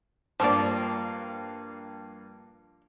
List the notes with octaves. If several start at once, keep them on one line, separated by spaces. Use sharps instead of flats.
G2 F3 A#3 D5